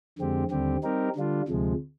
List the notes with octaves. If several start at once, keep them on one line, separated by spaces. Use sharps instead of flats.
F2 D3 G#3 C4 G4
D#2 D3 G3 C4 G4
G3 C4 D#4 G4 A#4
D3 G3 D4 F4
D2 C3 F3 G#3